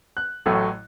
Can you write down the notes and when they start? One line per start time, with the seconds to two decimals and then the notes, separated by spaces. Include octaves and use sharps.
0.17 F#6
0.46 A1 A2 F#3 A3 E6